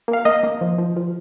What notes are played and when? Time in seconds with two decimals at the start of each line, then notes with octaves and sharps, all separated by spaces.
0.08 A#3
0.13 F5
0.25 A#3 D#5
0.43 A#3
0.61 F3
0.78 F3
0.96 F3